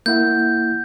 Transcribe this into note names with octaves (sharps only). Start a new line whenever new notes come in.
A#3 E4 F#5 G6